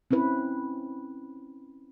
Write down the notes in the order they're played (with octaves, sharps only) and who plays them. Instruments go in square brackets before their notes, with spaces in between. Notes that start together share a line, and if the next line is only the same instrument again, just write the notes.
[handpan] C4 C#4 E4 B4